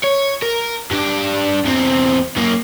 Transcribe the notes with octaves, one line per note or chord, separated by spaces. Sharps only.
C#5
A#4
G2 D4
E2 C4
F#2 A#3